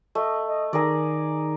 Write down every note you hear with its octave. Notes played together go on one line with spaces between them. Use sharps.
A3 D#5
D#5
D#3 G#4 A#4 D5